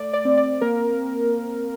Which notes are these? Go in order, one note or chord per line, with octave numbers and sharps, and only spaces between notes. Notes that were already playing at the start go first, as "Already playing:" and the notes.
Already playing: A3 D5
D5
C4
D5
A#3 A#4